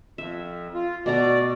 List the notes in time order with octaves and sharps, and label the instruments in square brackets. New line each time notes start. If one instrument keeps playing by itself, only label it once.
[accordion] F2 [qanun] E5
[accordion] F4
[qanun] B2 A3 A#5 [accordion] D5